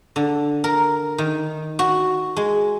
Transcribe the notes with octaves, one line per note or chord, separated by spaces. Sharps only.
D3
A#4
D#3
F#4
G#3